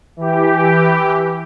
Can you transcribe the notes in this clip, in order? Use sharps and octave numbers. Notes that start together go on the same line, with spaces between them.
E3 G4